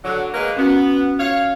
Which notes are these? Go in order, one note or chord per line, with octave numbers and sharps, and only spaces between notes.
D3 F#3
G#3 A#3 B4
B3 C#4 F#4
C#5 F5